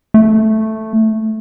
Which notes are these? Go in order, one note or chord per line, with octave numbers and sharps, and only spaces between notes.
A3